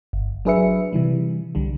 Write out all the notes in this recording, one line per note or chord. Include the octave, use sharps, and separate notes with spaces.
G1
F#3 D4 G#4 B4 E5 C#7
C3 E3 G3
C2 D3 G3